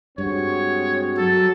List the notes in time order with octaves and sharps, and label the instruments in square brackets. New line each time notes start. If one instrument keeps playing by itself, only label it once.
[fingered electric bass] G2 [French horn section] G#3 C4 F#4 [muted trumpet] C#5
[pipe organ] F#3 [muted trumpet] A4